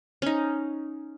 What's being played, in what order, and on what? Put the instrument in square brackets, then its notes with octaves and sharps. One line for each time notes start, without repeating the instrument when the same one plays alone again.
[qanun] C#4 D#4